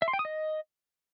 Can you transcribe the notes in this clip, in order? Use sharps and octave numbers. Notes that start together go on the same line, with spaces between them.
E5
C6
G5
D#6
D#5